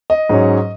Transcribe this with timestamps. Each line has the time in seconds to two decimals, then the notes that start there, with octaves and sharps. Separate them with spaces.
0.10 D#5
0.29 G#2 F#3 C#4